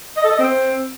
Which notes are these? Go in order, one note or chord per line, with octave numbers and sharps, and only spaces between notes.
D#5
A4
D#5
C4